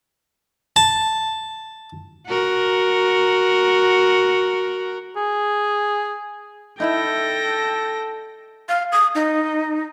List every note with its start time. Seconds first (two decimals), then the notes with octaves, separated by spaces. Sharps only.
0.76 A5
2.27 F#4 A#4
5.16 G#4
6.80 D#4 E4 A4 E5 G5 A#6
8.69 F5
8.92 D#6
9.15 D#4